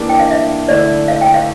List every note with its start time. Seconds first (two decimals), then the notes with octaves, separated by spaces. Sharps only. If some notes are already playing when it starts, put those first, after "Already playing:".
Already playing: E3 A#3 D4 G4
0.09 G5
0.19 F5
0.31 E5
0.69 D3 A3 E4 D5
1.08 F5
1.21 G5
1.34 F5